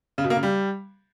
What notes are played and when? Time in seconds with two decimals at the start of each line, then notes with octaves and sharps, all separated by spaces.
0.18 C#3
0.24 B2
0.30 A#3
0.37 C#3
0.43 G3